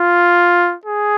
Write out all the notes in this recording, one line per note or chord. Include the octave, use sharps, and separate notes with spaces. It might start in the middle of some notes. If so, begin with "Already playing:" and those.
Already playing: F4
G#4